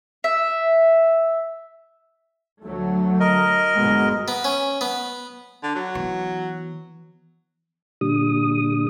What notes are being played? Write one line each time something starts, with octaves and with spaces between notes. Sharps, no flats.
E5
D2 F#3 A3
A#4 D#5
G1 B2 G#3
B3
C#4
B3
D3
F#3
E3 B3
A#2 D3 G3 D#6